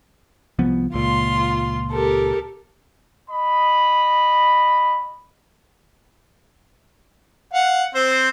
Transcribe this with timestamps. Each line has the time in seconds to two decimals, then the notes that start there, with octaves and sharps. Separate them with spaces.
0.59 C2 F3 B3
0.94 C#2 A#2 F4 C6
1.92 G4 A4 A#4
3.31 D#5 B5
7.54 F5 F#5
7.95 C4 C5